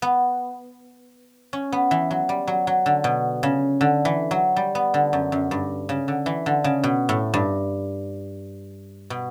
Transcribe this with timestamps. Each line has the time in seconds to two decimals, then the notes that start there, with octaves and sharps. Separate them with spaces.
0.02 B3
1.53 C#4
1.72 B3
1.91 E3
2.11 F#3
2.29 G3
2.48 F#3
2.67 F#3
2.86 D3
3.04 B2
3.43 C#3
3.81 D3
4.05 E3
4.31 F#3
4.56 G3
4.75 B3
4.94 D3
5.13 F#2
5.32 F#2
5.51 G2
5.89 C#3
6.08 D3
6.26 E3
6.46 D3
6.64 C#3
6.84 B2
7.09 A2
7.34 G2
9.10 B2